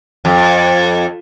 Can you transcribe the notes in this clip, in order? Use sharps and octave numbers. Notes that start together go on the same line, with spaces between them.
F2